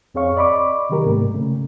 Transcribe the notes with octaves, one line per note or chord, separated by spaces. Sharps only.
F2 C4 G#4 C#5 F5 C#6
D5 D#5 B5 C#6 D6
C3 D#3 F#3 G4 A#4
G#2 C3 A3 A#3
C#3 A3